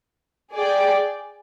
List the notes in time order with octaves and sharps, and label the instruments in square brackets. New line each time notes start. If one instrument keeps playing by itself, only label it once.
[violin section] G#4 D5 G5